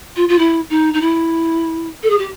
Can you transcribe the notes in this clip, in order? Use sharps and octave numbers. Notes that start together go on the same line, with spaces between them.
F4
F4
E4
D#4
D#4
E4
A4
G#4
G4